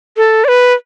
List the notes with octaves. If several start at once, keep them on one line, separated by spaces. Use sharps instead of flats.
A4
D5
B4